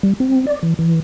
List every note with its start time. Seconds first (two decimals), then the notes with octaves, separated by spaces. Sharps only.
0.03 G3
0.20 C4
0.47 D5
0.63 E3
0.79 E3